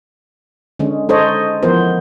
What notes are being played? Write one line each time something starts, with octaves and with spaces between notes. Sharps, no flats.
D3 G#3 C#4
G#3 D#4 A4 C5 C#5 D#5
E3 F3 B3 A#4 C5